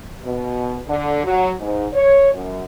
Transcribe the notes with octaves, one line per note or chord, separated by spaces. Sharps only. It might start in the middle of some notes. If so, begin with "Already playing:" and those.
B2
D3
F#3
G#2
C#5
F#2